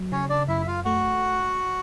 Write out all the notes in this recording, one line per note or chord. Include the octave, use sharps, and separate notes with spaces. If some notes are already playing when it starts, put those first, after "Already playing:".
Already playing: F#3
C#3 C#4 C#5
D4 D5
F#2 E4 E5
E5
F4 F5
A3 F#4 F#5